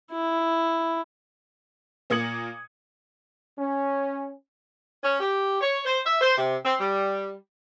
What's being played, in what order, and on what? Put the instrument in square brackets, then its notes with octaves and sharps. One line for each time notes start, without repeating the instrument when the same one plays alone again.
[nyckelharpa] E4
[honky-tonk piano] A#2 A#3 D#6 G#6 C#7 F#7
[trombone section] C#4
[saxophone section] C#4
G4
C#5
C5
E5
C5
C3
C4
G3